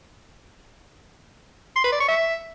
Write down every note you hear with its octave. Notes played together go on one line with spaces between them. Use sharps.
C6
B4
D5
C#6
E5